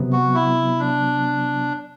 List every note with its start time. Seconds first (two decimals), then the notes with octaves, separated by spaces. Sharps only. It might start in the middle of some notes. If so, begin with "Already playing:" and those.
Already playing: C3 F#3 B3
0.13 F#4
0.34 E4
0.80 D4